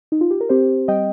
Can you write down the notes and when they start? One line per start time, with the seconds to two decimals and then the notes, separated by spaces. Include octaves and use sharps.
0.12 D#4
0.21 F4
0.30 G4
0.41 A#4
0.49 C4 G4 C5
0.88 G3 D#5 G5